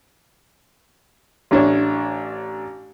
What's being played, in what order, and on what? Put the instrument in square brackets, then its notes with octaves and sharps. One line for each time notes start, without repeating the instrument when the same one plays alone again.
[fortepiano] A1 D4 C#5